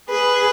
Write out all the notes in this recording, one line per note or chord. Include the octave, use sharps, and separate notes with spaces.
G#4 B4